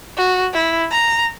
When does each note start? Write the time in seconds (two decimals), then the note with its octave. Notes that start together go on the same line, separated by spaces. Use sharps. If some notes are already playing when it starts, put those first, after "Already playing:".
0.17 F#4
0.53 E4
0.91 A#5